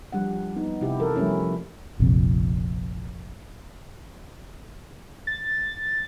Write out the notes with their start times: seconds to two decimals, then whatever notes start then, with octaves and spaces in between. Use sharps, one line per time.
0.12 F3 G3 D4 F#5
0.56 B3 D#4
0.81 C3 E4 G4
1.00 E3 A4 A#4
1.16 F3 G3 A3 C#4 E4
1.43 F3
2.00 F1 A#1 F2
5.27 A6